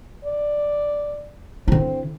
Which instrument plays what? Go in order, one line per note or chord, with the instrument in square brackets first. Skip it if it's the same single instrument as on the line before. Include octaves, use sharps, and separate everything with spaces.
[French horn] D5
[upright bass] D3 E4 [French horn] C4